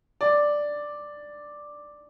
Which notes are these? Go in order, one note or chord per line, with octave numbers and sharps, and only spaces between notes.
D5